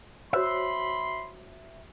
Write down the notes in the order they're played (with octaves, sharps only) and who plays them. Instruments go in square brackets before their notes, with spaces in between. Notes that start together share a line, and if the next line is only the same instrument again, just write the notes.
[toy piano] F#4 C5 C#5 [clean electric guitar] E5 [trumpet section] B5 C6